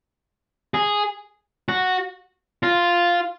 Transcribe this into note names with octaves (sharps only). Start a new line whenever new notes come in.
G#4
F#4
F4